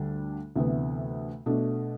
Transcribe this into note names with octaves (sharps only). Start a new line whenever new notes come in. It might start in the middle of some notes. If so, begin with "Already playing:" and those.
Already playing: D2 D3 G3 D4
D2 C3 E3 B3
B2 A3 D4